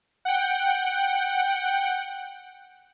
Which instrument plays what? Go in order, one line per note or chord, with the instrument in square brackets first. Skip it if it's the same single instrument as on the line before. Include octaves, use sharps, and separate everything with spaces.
[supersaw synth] F#5 G5